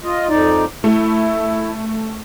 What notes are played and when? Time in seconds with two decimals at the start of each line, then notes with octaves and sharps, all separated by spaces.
0.04 F4 D#5
0.29 F2 D#4 D5
0.84 A3 E4